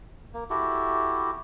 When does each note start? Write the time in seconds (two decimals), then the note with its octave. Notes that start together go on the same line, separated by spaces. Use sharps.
0.34 A#3
0.50 E4 F#4 G4 A4